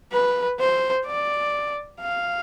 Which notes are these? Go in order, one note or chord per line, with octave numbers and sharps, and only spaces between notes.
B4
C5
D5
F5